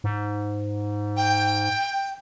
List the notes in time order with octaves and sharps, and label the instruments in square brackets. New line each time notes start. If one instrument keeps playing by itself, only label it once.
[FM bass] G#2
[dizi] G5